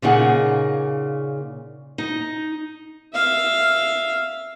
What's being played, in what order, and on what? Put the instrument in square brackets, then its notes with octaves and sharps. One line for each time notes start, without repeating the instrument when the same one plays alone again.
[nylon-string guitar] A#2 C#3 D#4 G#4 F#5
D#4
[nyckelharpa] E5 F5